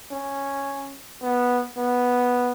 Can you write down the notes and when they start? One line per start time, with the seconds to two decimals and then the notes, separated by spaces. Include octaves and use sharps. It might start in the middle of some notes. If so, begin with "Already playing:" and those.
0.12 C#4
1.22 B3
1.77 B3